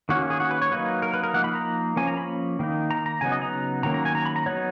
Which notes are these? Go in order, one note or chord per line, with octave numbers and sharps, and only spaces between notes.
D#3 A#3 C#4 F#4
G#4
F#4
B4
C#5
F#3 A#3 D#4 B4
A#4
B4
A#4
F3 A#3 D#4 F#5
B5
A#5
F3 A#3 C#4 G#5
A#5
B5
D#3 A#3 D#4
A#5
A#5
C#3 F#3 B3 D#4 G#5
D#5
A#5
D#3 F#3 A#3 C#4 A#5
A#5
G#5
A#5
B5
A#5
F#3 B3 D#4 C#5